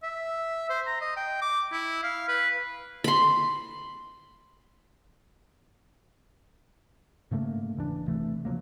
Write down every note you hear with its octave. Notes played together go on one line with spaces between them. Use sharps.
E5
C5
A#5
D#5
G5
D6
E4
F5
B4
B5 C6
G#2 C#3 A3 A#3
E1 E3 D4
G1 C3 E3 A3
C#3 F3 F#3 A#3